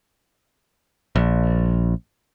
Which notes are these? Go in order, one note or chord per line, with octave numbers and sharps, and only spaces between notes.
A#1